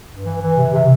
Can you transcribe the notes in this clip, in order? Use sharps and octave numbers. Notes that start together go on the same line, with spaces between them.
G2
E3
E3
C3
C3